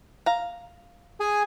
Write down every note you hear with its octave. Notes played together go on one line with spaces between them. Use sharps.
F5 A#5
G#4 G#5